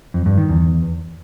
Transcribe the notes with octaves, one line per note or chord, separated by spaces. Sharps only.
F2
G2
D#3
E2